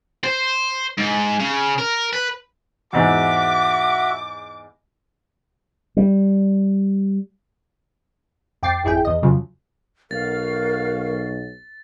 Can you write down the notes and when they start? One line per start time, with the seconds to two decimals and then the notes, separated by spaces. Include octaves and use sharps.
0.24 C5
0.98 G#2
1.40 C#3
1.78 A#4
2.13 B4
2.93 E2 G#2 F#4 E5 D6
5.97 G3
8.63 F2 G5 D6 A6 C7
8.84 G#1 F2 E4 G#4 G5
9.05 E2 D#5
9.22 F2 C#3 F3 F#3
10.11 B1 F#4 A#4 F5 A6